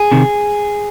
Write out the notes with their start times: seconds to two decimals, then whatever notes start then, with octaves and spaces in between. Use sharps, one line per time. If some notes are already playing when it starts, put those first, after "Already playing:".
Already playing: G#4
0.12 C3 D#3